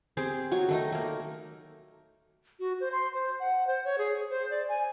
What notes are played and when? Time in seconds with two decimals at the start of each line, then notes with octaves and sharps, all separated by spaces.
0.17 C4 G4 G#4 C5
0.51 F#3 F#4 C#6
0.68 D#3 A3 D#4
0.92 A3 A#3
2.60 F#4
2.80 C5
2.92 C6
3.14 C5
3.40 F#5
3.67 C5
3.84 C#5
3.98 G#4
4.30 C5
4.50 D5
4.68 G#5